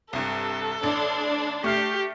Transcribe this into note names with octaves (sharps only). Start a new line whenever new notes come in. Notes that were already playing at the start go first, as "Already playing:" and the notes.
C2 G2 A4
A1 D4
A3 G4 F6 C7